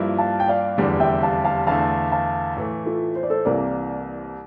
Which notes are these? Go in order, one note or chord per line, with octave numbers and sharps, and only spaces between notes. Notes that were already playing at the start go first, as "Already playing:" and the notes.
Already playing: G2 F3 A#3 E4
F5 A5
G5
D5 F5
F1 E2 D3 G3
E5 G5
F5 A5
F5 A5
E2 D3 A3 F5 A5
F5 A5
A2 E3 A3
F4 A4
C5
D5
A4 C5
C2 C3 E3 A#3 A#4 D5